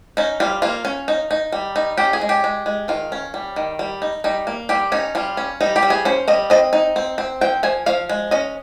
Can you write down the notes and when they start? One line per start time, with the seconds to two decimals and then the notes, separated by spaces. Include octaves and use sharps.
0.17 C#4 D#4
0.40 G3 F4
0.62 A#3 F4
0.85 C#4
1.08 D#4
1.31 D#4
1.52 G3
1.76 D#4
1.97 C#4 G4
2.13 G#4
2.21 G#3
2.29 G4
2.44 G#3
2.66 G#3
2.88 D#3 F4
3.12 C#4
3.34 G3
3.56 D#3
3.79 G3
4.02 D#4
4.24 G3 D#4
4.47 A#3
4.69 G3 G4
4.92 C#4 D#4
5.15 G3 F4
5.37 C#4
5.61 G3 D#4
5.76 G4
5.83 G3
5.90 G#4
6.05 C#4 C5
6.28 G3 D#5
6.50 C4 D#5
6.73 D#4
6.96 C4
7.18 C4
7.41 F3 G5
7.63 F3 G#5
7.86 F3 F5
8.09 G#3
8.31 C#4 D#5